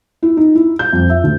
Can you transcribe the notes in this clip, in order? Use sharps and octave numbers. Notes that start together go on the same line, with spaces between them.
E4
D#4
E4
G6
F2
E5
D2